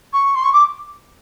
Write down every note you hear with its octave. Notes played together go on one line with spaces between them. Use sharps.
C#6
C6
C#6
D6